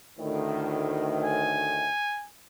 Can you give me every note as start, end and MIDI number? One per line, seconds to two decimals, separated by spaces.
0.18 1.90 38
0.18 1.90 45
0.18 1.90 51
1.24 2.27 80